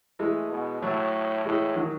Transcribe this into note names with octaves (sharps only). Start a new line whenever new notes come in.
E3 G#3 A3
B2
A2 F#3 A3
A2 E3 G#3
D#3 F#3